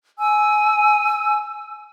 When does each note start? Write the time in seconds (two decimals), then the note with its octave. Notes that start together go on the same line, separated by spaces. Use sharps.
0.18 G#5 E6